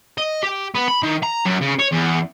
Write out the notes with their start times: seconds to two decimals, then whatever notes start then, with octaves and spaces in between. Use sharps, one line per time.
0.18 D#5
0.43 G4
0.75 B3
0.88 B5
1.03 D#3
1.23 A#5
1.46 F#2
1.62 C#3
1.80 C#5
1.92 E2